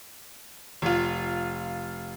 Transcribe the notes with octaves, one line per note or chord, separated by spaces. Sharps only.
F1 F4